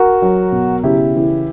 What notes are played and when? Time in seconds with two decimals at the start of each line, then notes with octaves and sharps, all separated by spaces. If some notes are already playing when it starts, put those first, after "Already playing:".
Already playing: F#4 A#4
0.22 F#3
0.52 B2
0.83 C#3 E4 G4
1.16 E3